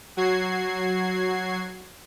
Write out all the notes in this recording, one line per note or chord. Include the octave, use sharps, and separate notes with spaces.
F#3 F#4 G#6 C7